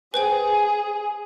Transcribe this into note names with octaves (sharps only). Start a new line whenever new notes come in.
G#4 B4 C5 G5